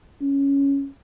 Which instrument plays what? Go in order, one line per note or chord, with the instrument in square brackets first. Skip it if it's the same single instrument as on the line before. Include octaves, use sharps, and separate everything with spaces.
[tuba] C#4